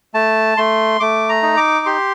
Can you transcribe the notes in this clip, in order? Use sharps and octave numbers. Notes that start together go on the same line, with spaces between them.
A3 A5
A3 C6
A3 D6
A#5
D#4
D6
G4 C6